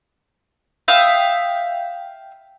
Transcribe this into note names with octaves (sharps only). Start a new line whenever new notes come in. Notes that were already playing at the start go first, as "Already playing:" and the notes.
E5 F5 G5 D#6